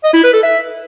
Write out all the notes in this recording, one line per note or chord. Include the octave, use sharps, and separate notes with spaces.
D#5
E4
B4
A4
E5